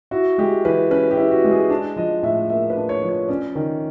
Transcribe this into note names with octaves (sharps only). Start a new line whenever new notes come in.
E4 F#4
G#3 G4
E3 B4
C#4 B4
G4
E4
F#4
G#3
G#4
D4
F3 D#5
A2 E5
A#3 E5
B4
D4
C#5
F3
C#5
C#4 D5
D#3